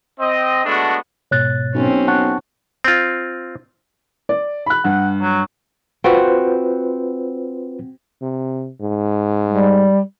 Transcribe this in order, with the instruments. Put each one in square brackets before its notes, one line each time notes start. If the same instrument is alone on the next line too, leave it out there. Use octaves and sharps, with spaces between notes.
[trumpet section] C4 D#5
G#3 A3 B3 D4 F#4
[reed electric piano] G#2 B2 A6 [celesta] C#5 F#6
[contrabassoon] B1 [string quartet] C4 C#4
[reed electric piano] F#5 A5 C#6 [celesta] F#6
[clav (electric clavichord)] C4 F4
[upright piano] D5
B5 F#6
[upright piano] G2 [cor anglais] F#5
[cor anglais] F#3
[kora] C4 F#4 [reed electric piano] F4 B4 C5
[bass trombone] C3
G#2
[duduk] G3